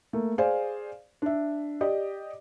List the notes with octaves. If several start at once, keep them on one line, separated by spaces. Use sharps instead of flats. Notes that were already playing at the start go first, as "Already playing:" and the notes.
A3 A#3
G#4 C5 D5 F5
D4 E5
G4 D5 D#5